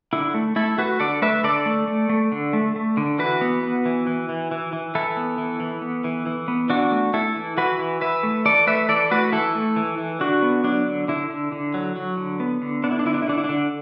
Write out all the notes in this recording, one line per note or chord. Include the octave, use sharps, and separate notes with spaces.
D3 E4
A3
A3 E4 A4
A3 F#4 B4
D3 A4 D5
A3 B4 E5
D3 A4 D5
A3
A3
A3
D3
A3
A3
D3
E3 F#4 B4
B3
B3
E3
E3
E3
E3
E3
E3 E4 A4
B3
E3
E3
B3
E3
E3
B3
E3 D4 F#4
A3
A3 E4 A4
E3
E3 F#4 B4
E3
E3 B4 E5
A3
E3 A4 D5
A3 B4 E5
E3 A4 D5
A3 F#4 B4
E3 E4 A4
A3
E3
E3
D3 D4 F#4
B3
F#3 D4
D3
D3 E4
D3
D3
F#3
F#3
D3
B3
D3
B3 D4
E4
D4
D3 E4
D4
E4
D3 D4
E4
D3 D4